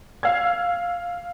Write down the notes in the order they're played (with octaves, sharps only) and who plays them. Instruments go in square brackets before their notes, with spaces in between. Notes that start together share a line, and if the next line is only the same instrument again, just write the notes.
[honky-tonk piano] F5 E6 G#6